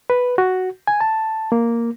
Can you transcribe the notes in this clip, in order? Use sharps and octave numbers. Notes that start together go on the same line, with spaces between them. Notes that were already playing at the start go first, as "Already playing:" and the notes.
B4
F#4
G#5
A5
A#3